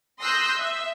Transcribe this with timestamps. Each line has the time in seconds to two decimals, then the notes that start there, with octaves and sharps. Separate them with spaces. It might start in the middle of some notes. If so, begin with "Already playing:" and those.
0.21 C6 D#6 E6 F#6 G6 A#6
0.61 E5